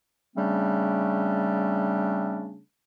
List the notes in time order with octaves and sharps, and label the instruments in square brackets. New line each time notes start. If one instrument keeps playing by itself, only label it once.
[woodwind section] C#3 G3 A3 C4 D4